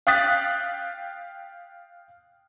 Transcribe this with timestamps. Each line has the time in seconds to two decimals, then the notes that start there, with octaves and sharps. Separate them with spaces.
0.07 F5 G5 D#6 F#6 A6 B6